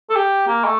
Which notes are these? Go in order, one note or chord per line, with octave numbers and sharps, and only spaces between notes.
A4
G4
A#3
A3